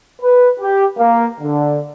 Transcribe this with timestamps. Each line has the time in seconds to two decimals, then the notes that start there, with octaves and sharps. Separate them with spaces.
0.22 B4
0.59 G4
0.98 A#3
1.41 D3